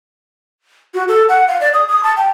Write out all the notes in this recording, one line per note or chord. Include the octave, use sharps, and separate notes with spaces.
F#4
A4
F#5
F5
D5
D#6
D#6
A5
G5